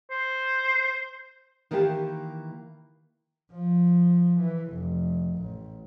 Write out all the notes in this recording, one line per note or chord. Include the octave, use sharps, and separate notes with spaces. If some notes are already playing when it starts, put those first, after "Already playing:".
C5
D#3 E3 A#3 E4 G4 A5
F3
E3
F1
A1